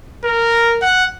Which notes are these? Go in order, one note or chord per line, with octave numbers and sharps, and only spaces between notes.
A#4
F#5